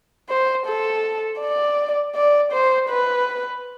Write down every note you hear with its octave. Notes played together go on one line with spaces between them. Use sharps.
C5
A4
D5
D5
C5
B4